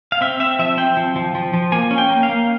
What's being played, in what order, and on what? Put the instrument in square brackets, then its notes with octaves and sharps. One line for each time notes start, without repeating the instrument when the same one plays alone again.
[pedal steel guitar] F5
C4 E5
C4 E5
F3 E5
C4 G5
F3
F3
F3
F3
A#3 G#5
C#4
G5
A#3
F5
A#3